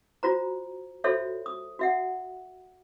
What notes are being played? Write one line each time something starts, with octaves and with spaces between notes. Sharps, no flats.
F4 F#4 C5 A#5
F4 F#4 A4 C5 C#5 E5
D#6
F#4 E5 F#5